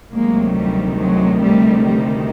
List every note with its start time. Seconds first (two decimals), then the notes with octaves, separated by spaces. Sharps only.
0.13 D2 C3 D#3 F#3 G#3 A#3
0.55 G3 A3
0.98 F#3 G#3
1.42 G3 A3
1.86 G3